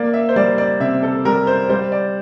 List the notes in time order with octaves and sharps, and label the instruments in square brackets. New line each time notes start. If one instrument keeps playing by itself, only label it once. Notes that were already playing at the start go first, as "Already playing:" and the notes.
Already playing: [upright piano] A#3 [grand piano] D5
[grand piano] E5
C5
[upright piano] G3 [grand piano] D5
[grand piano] D5
[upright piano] C3 [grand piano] E5
[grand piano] A4
[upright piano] G3 [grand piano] A#4
[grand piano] C5
[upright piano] G3 [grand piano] C5
[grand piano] D5